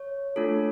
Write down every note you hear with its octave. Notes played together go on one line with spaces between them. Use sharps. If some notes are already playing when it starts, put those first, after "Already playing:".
Already playing: C#5
A3 D4 F4 A4